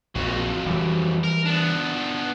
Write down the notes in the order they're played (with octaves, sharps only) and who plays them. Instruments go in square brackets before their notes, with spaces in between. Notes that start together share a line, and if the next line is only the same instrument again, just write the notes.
[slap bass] A#1 [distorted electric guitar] F2 F#3
[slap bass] E3 G3
[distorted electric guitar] A#4
B3 D4